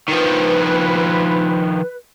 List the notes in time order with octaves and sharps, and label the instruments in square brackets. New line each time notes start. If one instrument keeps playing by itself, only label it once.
[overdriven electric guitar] D#3 F3 [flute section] B4